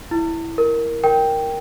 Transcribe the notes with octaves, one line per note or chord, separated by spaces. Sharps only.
E4
A#4
A#4 G5